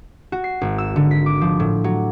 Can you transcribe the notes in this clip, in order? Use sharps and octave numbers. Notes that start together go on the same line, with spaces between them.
F#4
C7
G#1
E6
D3
B6
D6
F3
A2
F#3